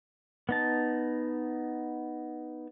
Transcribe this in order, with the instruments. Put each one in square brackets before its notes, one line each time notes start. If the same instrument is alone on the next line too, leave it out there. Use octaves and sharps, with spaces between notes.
[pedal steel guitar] B3 D#4 A5